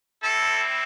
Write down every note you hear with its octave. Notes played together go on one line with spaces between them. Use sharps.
G3 C4 E4 A4